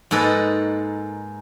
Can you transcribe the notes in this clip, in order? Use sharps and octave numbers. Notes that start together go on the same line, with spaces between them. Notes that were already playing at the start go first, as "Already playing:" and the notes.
G#2 A#3 A4 B4 D#5